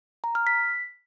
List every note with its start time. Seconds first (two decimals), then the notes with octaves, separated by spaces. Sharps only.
0.24 A#5
0.35 F6
0.47 B6